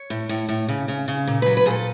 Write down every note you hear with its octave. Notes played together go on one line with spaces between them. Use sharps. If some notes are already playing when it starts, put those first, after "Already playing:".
Already playing: C#5
A2
A2
A2
C#3
C#3
C#3
A#2
F#3 B4
B4
A#2 G#4 A4